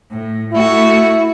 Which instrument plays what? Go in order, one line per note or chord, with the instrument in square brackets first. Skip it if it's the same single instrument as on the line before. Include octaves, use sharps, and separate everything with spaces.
[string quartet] A2
[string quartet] A3 F#4 [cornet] E4